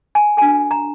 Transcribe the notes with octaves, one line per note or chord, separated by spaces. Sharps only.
G#5
D4 F#4 A4 G#5
A#5